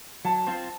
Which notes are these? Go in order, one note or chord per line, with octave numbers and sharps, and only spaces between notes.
F#3 A5
C4 F4 C5